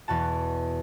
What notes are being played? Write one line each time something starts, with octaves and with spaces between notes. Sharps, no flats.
E2 B2 F#4 A5